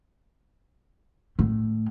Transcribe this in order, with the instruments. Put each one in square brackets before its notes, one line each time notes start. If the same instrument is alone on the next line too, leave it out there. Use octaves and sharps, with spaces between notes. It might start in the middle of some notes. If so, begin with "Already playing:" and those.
[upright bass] A2